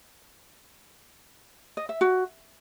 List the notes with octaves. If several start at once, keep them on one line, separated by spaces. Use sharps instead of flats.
D#5
E5
F#4